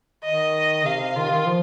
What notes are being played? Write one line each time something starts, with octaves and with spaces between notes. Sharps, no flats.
D#3 D#5
C3 F5
D#3 F4
D#3
F3